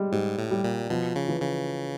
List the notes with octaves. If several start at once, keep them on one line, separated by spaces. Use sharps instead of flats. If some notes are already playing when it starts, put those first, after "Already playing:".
Already playing: G3 G#3
G#2 G3
A2
G3
A#2
B2 F3
C#3
E3
C#3